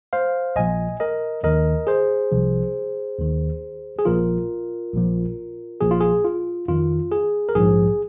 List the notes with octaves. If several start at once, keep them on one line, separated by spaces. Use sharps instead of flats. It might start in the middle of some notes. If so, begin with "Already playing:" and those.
C5 F5
A#1 A#2 F3 D#5 G#5
A#4 D#5
D#2 D#3 A#4 D#5
G#4 C5
C2 C3 F3
D#2 D#3
G#4
A#1 A#2 F3 F4 A#4
A#1 A#2 F3
A#1 A#2 F3 G#4
F4
G#4
F4
F2 D#3 F4
G#4
A#4
A#1 G#2 F3 G#4